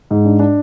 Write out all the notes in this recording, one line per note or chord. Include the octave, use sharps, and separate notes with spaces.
G#2
D4
D4